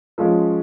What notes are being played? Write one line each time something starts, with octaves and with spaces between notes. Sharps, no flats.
F3 G#3 C#4